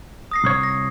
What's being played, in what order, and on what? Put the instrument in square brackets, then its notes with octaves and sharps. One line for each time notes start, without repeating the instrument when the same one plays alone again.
[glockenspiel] D#6 A#6 C7
[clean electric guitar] C2 C#5
[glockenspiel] A#6